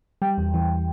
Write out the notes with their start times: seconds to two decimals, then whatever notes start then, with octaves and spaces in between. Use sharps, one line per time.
0.22 G3 G5
0.38 E2
0.54 E3